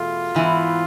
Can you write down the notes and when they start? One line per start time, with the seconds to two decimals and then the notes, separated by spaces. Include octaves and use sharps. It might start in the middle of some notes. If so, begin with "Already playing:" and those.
Already playing: E2 B2 A3 F4
0.35 G#2 E3 B3 E4